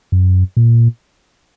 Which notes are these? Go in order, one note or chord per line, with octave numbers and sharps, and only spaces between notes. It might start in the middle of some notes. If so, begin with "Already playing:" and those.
F#2
A#2